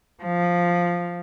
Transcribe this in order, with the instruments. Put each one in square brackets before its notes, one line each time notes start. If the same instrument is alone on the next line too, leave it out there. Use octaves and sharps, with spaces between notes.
[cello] F3